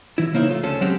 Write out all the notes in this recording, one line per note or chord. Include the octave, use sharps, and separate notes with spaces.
E3 E4
C#3 A#3 D#4 E4 C5 E5
F3 A3 F4
D2 C#3 C#4 A4 C5
F#3 G#3 A3 C4 C#4 G4